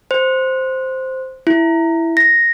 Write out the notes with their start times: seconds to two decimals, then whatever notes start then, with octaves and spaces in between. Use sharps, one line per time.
0.11 C5
1.47 E4
2.17 A#6